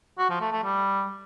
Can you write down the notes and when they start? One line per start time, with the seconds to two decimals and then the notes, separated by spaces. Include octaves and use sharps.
0.18 F#4
0.30 F3
0.41 A3
0.52 A3
0.64 G3